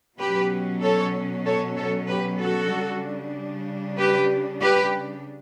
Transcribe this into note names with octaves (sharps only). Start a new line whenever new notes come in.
B2 F#3 C#4 G4 B4
A4 C#5
A4 C#5
A4 C#5
G4 B4
F#4 A4
C#3 G3 D4
G4 B4
G4 B4